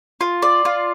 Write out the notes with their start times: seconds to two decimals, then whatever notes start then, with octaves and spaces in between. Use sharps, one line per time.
0.21 F4
0.42 D5
0.65 F4